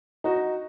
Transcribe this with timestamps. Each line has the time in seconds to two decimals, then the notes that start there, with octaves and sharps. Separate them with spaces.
0.24 D#4 F#4